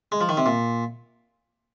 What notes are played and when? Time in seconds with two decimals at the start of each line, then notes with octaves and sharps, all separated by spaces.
0.12 G#3
0.21 F3
0.29 D#3
0.37 C3
0.46 A#2